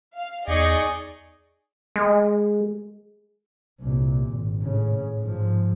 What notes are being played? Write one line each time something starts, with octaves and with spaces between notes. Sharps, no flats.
F5
E2 D#4 G#4 D5 D#5 C#6
G#3
C2 A#2
G#1
A2 C#3
G#2 F3